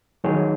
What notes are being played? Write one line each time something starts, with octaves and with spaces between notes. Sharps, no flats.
D#3 F#3 D#4 G#4 C#5